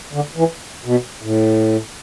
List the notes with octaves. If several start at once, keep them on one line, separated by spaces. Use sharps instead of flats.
D3
E3
B2
A2